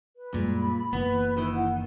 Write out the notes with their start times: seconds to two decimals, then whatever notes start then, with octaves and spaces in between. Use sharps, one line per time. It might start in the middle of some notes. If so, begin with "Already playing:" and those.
0.16 B4
0.34 F#2 A#2 G3 G#3
0.55 B5
0.93 F#1 E3 A#3 B3 B4
1.38 D#3 E4
1.54 F#5